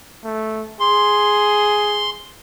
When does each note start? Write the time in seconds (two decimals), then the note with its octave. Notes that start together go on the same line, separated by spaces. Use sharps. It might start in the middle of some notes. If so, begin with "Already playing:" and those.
0.24 A3
0.80 G#4 C6